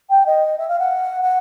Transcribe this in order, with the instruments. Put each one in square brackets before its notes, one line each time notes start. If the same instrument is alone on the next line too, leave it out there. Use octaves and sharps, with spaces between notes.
[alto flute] G5
D#5
E5
F5
F#5
F#5